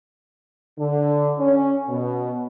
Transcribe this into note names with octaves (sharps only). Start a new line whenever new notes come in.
D3
C#4
B2